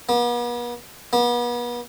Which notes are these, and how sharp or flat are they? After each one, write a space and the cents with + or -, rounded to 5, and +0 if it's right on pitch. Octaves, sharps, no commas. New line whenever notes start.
B3 -45
B3 -40